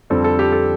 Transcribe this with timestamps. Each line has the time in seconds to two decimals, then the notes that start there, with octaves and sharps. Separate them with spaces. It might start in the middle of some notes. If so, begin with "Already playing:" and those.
0.10 F2 D3 G3 C4 A4
0.24 A4
0.39 G4
0.52 A4